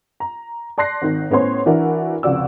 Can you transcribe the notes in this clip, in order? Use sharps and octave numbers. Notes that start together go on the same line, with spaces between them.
A#5
D5 A5 C6 F#6 A#6 C7
G#1 D#3
A2 B3 C#4 C5 C#5 C6
E3 D4 E4 F#4 A#4
F1 C#2 F3 F#4 D5 E6